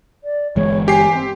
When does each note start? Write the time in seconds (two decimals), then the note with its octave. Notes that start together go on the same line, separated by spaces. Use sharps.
0.24 D5
0.56 G1 E3 G#3 C#5
0.88 G4 G#5 C7
1.15 C4